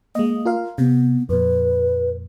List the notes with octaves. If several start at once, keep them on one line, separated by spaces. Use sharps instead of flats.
G#3 A#3 D#5
F4 A#4 F5
C3 B3
F2 A#2 B4